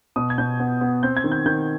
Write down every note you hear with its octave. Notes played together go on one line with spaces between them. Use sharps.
B2 D#6
G#6
B2 G6
B3
B3
C4 G6
G#6
D#3
G6
D#3 G6